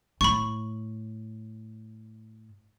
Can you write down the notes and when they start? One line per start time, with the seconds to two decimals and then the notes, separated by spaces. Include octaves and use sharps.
0.21 A2 B5 C#6